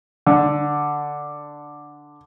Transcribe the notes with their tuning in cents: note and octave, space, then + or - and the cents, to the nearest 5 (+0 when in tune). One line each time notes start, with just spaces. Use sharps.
D3 +0